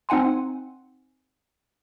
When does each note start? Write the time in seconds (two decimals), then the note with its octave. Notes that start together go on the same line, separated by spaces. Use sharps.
0.09 C4 D#4 F#5 G#5 C6